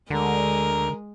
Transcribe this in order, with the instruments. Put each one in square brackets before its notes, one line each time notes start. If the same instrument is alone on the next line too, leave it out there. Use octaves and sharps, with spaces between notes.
[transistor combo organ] D2 [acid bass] D3 [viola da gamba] G#3 [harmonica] A#4